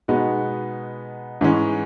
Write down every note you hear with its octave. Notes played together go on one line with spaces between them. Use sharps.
B2 G#3 B3 D#4 F#4
G#2 E3 G#3 C#4